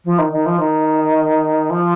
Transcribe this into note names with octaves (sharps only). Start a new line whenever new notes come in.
F3
D#3
D#3
F3
D#3
F3